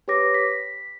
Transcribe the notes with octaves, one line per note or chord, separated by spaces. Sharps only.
G4 B4 C#5 D6 A#6
B6